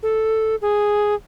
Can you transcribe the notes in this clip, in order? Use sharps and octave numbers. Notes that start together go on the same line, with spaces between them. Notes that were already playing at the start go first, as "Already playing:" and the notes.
A4
G#4